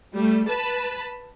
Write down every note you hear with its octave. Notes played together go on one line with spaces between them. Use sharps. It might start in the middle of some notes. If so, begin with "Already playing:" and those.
G3 A3
B4 A5 B5